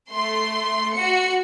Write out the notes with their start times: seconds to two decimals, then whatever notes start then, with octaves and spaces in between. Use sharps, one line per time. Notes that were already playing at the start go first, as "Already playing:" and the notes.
0.12 A3 C6
0.95 F#4 C#7